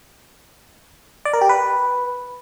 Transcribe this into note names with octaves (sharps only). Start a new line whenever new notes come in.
D5
A#4
G4
B4